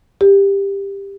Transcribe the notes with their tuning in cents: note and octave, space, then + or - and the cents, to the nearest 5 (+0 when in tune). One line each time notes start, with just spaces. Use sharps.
G4 +15